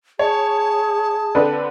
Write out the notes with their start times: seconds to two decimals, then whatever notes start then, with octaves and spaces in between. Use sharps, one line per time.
0.19 G#4 C#5 A5
1.35 D3 C4 B4